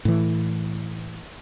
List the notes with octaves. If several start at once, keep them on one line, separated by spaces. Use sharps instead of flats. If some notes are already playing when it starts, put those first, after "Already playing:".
A2 E3